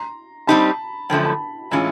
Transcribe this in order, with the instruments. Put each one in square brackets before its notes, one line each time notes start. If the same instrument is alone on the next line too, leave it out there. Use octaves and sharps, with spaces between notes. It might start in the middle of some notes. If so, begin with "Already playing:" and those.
Already playing: [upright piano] A#5 C6
[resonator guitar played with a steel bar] G3 C4 D#4 G4 [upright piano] A5 B5
[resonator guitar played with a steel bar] F#2 D3 F3 A3 [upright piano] G5 A5
[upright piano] A5 B5
[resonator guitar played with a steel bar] A2 E3 G#3 C#4 F4 [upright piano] G#5 A#5